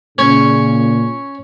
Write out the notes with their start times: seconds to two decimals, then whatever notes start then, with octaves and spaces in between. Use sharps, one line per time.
0.18 A#2 C#3 C#4 C#5